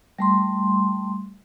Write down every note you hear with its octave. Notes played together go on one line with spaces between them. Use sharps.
G3 A3 C6